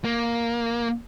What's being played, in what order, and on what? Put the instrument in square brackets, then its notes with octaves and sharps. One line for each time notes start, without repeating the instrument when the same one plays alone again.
[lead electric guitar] A#3